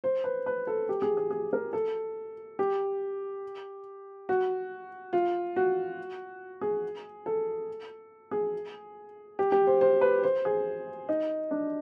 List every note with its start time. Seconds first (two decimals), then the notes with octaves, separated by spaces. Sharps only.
0.04 C5
0.24 B4
0.46 B4
0.67 A4
0.89 G4
1.02 G#4
1.17 G#4
1.31 G#4
1.53 A#4
1.73 A4
2.59 G4
4.29 F#4
5.13 F4
5.56 F#4
6.61 G#4
7.26 A4
8.31 G#4
9.39 G4
9.52 G4
9.67 C5
9.81 C5
10.01 B4
10.23 C5
10.45 G#4
11.09 D#4
11.51 D4